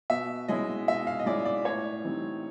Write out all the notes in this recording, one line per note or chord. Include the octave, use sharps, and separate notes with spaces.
B2 E5
G#3 C#4 E4 D#5
B2 E5
F5
D#5
G#3 C#4 E4 D5
D5
A2 C#5
E3 G3 C4 D#4